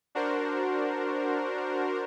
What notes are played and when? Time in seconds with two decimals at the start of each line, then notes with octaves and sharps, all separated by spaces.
0.15 D4 F#4 A#4 C5